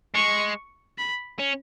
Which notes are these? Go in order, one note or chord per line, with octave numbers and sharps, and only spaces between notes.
G#3 C#6
B5
C#4